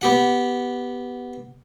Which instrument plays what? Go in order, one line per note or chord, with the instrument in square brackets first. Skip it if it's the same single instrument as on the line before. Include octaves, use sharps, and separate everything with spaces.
[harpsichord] B3 G4 F#5